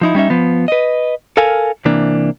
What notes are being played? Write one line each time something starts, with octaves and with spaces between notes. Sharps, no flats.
F3 D#4 E4
G3 C#4 D#4 E5
F3 B3
B4 D#5
A4 A#4 F5 G#5
C3 E3 A#3 D4